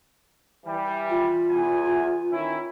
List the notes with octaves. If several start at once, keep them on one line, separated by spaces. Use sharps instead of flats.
E3 G3
F4
E2 G#5
D#3 C#4 E4